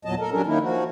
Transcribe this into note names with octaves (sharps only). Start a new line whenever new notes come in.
E2 A#2 F#3 D#5 A5
A4 A#4
F#3 G3 C#4 D4 A#4
D#3 A#3 C#4 D#4 E4
F3 F#4